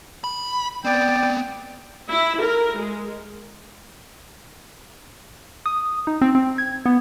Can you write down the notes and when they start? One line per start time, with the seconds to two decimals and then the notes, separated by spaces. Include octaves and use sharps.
0.24 B5
0.85 B3 C4 D5 G5
2.12 E4
2.43 A#4
2.79 G#3
5.66 D#6
6.07 D#4
6.22 C4
6.35 C4
6.58 G#6
6.86 B3